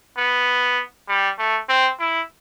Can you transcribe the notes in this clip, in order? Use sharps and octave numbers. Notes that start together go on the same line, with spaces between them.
B3
G3
A3
C4
E4